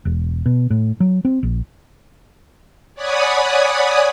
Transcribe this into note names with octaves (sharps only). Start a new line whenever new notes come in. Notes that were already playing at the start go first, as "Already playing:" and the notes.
E1
B2
A2
F#3
C4
A#1
C#5 D5 F#5 G#5 B5 D#6